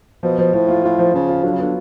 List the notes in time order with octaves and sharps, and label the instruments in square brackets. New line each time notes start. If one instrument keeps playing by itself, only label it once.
[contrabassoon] B2 [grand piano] F3
[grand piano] F3
[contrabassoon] A2 [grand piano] F3
[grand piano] F4
[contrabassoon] A2 [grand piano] F4
[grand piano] F3
[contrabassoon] C#3 [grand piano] F3
[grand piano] F4
[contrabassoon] D3 [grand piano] F#3
[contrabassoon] C#3
[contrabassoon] D3 [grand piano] B3